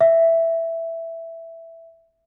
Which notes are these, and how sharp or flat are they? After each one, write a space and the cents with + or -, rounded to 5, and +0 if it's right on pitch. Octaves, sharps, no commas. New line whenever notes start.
E5 +5